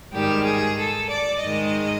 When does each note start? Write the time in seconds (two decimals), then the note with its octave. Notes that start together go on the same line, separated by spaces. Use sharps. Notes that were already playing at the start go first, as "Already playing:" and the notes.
0.13 G#2 D#3 G3 G4
0.45 G#4
0.77 A4
1.09 D5
1.42 G#2 D#3 G#3 D#5